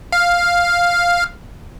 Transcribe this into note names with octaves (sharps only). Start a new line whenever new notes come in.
F5